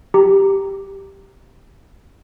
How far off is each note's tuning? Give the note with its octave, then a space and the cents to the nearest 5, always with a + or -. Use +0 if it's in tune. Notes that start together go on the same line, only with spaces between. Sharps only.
G4 +0 A#5 +0